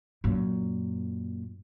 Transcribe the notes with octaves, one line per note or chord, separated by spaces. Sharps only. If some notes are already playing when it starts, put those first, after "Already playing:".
F#2 A#2